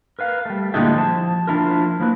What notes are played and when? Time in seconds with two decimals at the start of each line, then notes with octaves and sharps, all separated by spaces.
0.19 A#4 B4 F5
0.45 G3 A3
0.74 A#2 D3 G#3 A3 E4 G4
0.96 F3 A5
1.47 F3 G3 D4 E4 F4 A#4
2.00 F3 F#3 A#3 C4 E4 B4